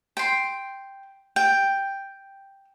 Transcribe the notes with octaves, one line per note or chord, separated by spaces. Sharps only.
G5 C6
G5